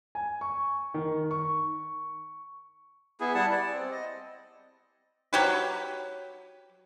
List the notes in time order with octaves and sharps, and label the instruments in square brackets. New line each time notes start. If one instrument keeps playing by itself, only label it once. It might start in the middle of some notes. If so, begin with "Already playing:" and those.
[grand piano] G#5
C#6
D#3
C#6
[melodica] B3 E4 G#4
G3 E4 F#5 A5
D5
C4
D#5
[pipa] F#3 G4 B4